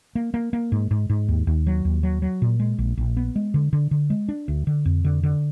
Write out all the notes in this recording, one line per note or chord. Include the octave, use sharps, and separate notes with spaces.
A#3
A#3
A#3
G#2
G#2
G#2
D#2
D#2
F#3
D#2
F#3
F#3
A#2
G#3
A#1
A#1
B3
G#3
D3
D3
D3
G#3
D4
D2
D3
F2
D3
D3